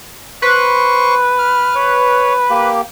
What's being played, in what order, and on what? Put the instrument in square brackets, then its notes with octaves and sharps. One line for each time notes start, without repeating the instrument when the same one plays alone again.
[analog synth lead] B4 [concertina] C5 C#6
[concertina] F6
C#5
A#3 G4